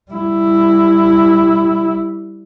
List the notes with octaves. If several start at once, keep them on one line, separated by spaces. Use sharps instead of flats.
G3 E4